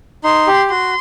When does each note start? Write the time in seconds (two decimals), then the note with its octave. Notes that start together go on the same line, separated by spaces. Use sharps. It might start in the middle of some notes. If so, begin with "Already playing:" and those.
0.24 D#4 C6
0.47 G4
0.70 F#4 C6